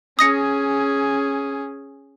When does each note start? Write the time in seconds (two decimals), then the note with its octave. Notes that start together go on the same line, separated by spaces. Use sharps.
0.19 C#4 G#4 D#6 A#6 C#7